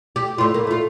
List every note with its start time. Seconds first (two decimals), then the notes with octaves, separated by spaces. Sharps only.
0.16 G4
0.38 A2 F4
0.54 A#3
0.67 A3 F4